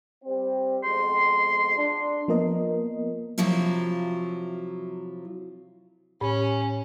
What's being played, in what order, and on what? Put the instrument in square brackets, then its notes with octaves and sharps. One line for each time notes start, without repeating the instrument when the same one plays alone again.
[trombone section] G3 C4
[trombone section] F2 B2 G#3 [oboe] C6
[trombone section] D4
[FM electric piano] F3 A#3 B3 A#4 D#5
[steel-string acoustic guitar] C3 F3 F#3 E4 F4
[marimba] A2 [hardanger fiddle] C#4